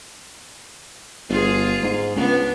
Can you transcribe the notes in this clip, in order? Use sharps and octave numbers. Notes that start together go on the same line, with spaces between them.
G1 F4 G#4
G#2
C#2 B3 D4